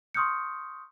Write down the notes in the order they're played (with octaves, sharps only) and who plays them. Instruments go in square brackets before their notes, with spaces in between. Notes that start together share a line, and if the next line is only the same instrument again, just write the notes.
[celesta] C6 C#6 D#6 F6 G6 C#7